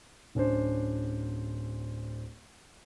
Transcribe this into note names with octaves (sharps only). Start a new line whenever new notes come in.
D1 C#4 D4 C5